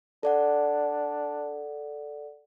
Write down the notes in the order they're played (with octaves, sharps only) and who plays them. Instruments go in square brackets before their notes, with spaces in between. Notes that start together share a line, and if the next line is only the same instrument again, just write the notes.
[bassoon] D4 [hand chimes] A4 D5 F#5